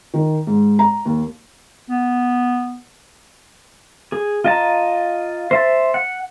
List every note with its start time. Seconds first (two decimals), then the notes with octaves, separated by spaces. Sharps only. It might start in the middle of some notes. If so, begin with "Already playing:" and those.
0.14 D#3
0.47 G#2
0.79 A#5
1.06 D#2
1.90 B3
4.12 G#4
4.44 F4 D#5 A5 A#5
5.51 C5 E5 A5
5.94 F#5